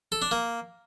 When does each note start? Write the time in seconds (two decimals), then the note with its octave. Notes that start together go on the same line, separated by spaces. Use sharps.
0.12 A4
0.22 D4
0.31 A#3